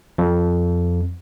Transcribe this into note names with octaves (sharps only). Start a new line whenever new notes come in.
F2